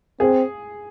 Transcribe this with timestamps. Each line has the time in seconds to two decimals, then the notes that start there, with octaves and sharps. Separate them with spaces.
0.20 C4 G#4